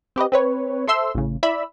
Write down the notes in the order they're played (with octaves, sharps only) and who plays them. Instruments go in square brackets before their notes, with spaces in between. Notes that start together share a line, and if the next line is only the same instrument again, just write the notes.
[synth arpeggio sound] C4 G4 B4 D#5
C4 B4 C#5
A4 C5 E5 C6 E6
A1 C#3
E4 D5 E5 B5 E6